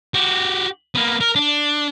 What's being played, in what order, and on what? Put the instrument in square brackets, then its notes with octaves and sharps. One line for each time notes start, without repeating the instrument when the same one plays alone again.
[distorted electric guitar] F#4 G4
A#3 B3
A#4
D4